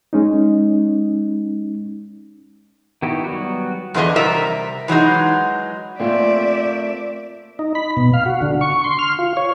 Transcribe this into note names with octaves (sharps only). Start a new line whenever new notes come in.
G#3 C#4 D#4
D#3 B3 E4 F#4 G4
F#3 G3 B3 F#4
E2 D3 F3 G#4 D#5 E5
C3 G3 A#4 E5 A#5
E3 F#3 G#3 D#4
A3 A#3 C4 F4 D5 E5
D#4
B5
B2
F5
F#4
D3
C#6
C6
F6
F4
C#5